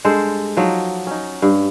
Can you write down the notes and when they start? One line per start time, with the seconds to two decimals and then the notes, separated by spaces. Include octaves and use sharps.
0.04 G2 G#3 A4 C5
0.57 F3 F#3 D#4
1.07 C#4 D#4
1.42 G2